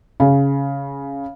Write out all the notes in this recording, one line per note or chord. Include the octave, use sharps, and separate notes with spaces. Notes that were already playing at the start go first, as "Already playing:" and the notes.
C#3